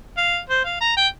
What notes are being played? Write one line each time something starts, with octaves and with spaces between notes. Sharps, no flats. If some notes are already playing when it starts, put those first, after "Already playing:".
F5
C5
F5
A#5
G5